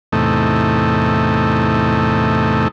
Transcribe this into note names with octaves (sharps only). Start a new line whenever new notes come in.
E2 A2 C3 A3 D#4